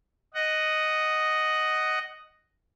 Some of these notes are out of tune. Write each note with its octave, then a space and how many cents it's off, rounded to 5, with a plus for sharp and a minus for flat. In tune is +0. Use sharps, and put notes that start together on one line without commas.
D#5 +0 F#5 +10